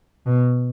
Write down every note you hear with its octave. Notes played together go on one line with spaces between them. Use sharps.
B2